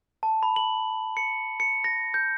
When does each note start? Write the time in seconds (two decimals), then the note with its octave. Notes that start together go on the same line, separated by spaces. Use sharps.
0.23 A5
0.43 B5
0.56 F#7
1.17 C#7
1.60 C#7
1.84 A#6
2.14 G6